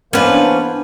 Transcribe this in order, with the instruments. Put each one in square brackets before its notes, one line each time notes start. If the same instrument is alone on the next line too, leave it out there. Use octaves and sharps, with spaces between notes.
[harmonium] E3 A#3 C5 [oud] B3 D4 [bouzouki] C#4 B4